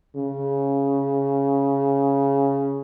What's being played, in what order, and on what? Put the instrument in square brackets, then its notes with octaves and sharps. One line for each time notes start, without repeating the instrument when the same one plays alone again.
[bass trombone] C#3